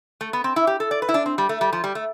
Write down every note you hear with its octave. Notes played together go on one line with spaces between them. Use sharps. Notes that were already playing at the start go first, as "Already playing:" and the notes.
A3
B3
C4
E4
G4
A4
D5
B4
E4
D4
C4
G3
A3
G3
F3
G3
A3